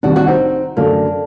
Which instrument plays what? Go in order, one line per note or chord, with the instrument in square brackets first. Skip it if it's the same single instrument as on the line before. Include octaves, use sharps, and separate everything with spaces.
[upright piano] C2 C3 D#3 [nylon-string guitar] D4 F#4
[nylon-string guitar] D4 F#4
C4 D#4
[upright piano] F#2 D3 A3 [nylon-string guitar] A#3 D4